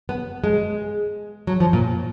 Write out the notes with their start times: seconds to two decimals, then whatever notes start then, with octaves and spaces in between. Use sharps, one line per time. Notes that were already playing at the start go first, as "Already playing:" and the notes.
0.09 B3
0.44 G#3
1.47 F#3
1.60 F3
1.73 A#2